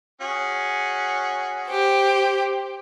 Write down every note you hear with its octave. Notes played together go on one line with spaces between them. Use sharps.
C#4 F#4 G#4
G4 C5